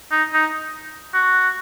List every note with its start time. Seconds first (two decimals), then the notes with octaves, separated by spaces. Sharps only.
0.12 D#4
0.33 D#4
1.14 F#4